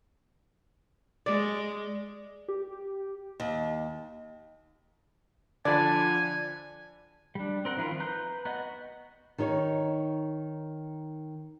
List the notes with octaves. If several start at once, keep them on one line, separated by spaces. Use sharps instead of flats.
G#3 D5
G4
D#2
D3 F3 D4 D5 G#5 B5 A6
G3 D4
C4 A#4 F#5
D#3 F3 E4 F4 A#4
B4 A#5 G6
B3 F#4 D#5 F#5
D#3 D#4 C#5